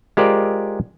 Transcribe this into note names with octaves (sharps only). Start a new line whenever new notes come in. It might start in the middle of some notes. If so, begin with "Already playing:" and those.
G#3 F4 G4 A#4 C5 D5